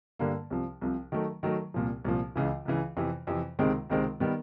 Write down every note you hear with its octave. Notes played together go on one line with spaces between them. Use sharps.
G2 D3 G3 A#3
C2 C3 F3
C2 C3 F3
D#3 F#3 A3
D#3 F#3 A3
C2 A#2 F3
C2 A#2 F3
C#2 C#3 E3
C#2 C#3 E3
F2 C3 E3
F2 C3 E3
C#2 C3 D#3 G#3 C4
C#2 C3 D#3 G#3 C4
D#3 G3 B3